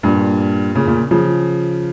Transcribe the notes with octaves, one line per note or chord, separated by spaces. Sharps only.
G2 A#2
A#2 C#3
A#2 C#3
C#3 F3